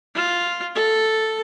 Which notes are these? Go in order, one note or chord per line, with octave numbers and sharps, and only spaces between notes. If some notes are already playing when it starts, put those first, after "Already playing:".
F4
A4